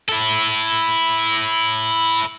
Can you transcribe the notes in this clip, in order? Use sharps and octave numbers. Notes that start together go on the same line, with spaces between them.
E4 A4